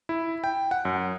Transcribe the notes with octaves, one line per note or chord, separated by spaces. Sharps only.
E4
G5
F#5
F#2